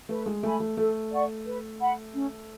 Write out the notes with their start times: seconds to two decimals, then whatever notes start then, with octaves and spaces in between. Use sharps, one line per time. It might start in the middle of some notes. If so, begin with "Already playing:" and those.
0.09 A3 B4
0.26 G#3
0.43 A3 E5 G#5 B5
0.60 A3
0.77 A3 A4
1.11 D5 F#5 C#6
1.46 B4
1.80 F#5 B5
2.14 C#4